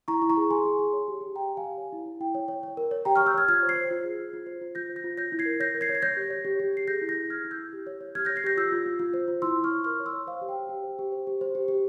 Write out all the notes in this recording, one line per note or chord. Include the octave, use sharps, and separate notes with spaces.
E4 A#5 C#6
E4
A#5 C#6
G#4
G#4 G#5 C6
G#4
G#4
C#5
G4
G4
G4 G5 A#5
G4
F5 G#5
G4
C#5
E4
E4
E4 G5
C#5
C#5
C#5
A#4
C#5
G4 G5 A#5
C#6 F6
C#5
E6 G6
C#5 F6 G#6
F4 F6 G#6
C5
G#6 C7
C5
F4
G#4
F4
F4
C5
F4
F4 G6 A#6
C5
G6 A#6
F4
C#5 G6 A#6
E4
G#6 C7
A#4
C#5 G6 A#6
A#4
G#6 C7
C#5
G#6
C#5 G6 A#6
G4
C#5
G4
G4
G4 C7
G#4 G6 A#6
E4
G6 A#6
G#4
E4 F6 G#6
E4
E6 G6
E4
G4
C#5
C#5
G4 F6 G#6
G6 A#6
C#5
G#6 C7
G4 G6 A#6
F4 E6 G6
F4
F4
F4
C5
F4
E4 C6 E6
E4
C#6 F6
C#5
A#4 C#6 F6
C#5
C6 E6
C#5
C5 F5
G4
G5
C5
G4
C5
G4
C5
G4
C5
G4
G4